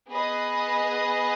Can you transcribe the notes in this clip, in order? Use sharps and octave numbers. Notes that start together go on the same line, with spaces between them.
B3 G#4 B4 D#5